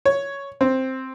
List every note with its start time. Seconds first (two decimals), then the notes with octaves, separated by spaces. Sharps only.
0.06 C#5
0.61 C4